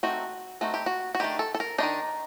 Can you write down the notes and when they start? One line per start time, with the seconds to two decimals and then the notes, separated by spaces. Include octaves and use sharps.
0.03 A3 C4 D#4 F#4
0.61 A3 C4 D#4 F#4
0.74 G4
0.86 F#4
1.15 F#4
1.20 D#3 A3 D4 G4
1.39 A4
1.55 A4
1.60 A#4
1.78 A3 D4 D#4
1.83 D#3